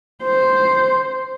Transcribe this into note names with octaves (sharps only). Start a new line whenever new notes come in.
C5